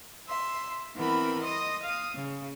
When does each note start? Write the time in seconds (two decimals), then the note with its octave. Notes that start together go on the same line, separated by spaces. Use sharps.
0.27 E5 C6
0.96 E3 B3 C4 A#4 B5
1.41 D#5 C6 D#6 A#6
1.83 F5 D#6
2.15 C#3